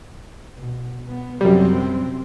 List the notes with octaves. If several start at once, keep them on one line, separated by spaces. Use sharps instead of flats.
B2
B3
F#2 C3 G3 C4